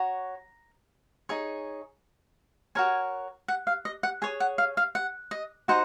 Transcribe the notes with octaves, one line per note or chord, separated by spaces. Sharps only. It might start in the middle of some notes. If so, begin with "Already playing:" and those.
Already playing: F#4 C#5 A#5
D#4 G#4 C#5
F#4 A#4 C#5 G#5
F#5
F5
D#5
F#5
G#4 C#5 G#5
F#5
F5
F5
F#5
D#5
D#4 F#4 C5 F#5